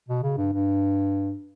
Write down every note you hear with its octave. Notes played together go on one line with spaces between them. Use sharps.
B2
C#3
G2
G2